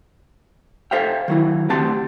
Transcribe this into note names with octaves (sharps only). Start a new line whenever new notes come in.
A4 C5 E5 F5 G5
D#3 F#3 E4
D2 C4 G4 F#5 A5 C6